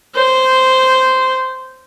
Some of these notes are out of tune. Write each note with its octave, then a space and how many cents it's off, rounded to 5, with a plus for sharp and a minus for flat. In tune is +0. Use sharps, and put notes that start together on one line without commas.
C5 -10